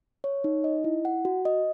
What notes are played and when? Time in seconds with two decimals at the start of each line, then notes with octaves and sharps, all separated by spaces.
0.24 C#5
0.44 D#4
0.64 D#5
0.84 E4
1.05 F#5
1.25 F#4
1.45 D#5